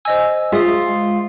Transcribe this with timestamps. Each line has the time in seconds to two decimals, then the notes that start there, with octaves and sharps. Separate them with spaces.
0.05 C5 D#5 G#5 E6
0.52 G#3 F4 E5 D#6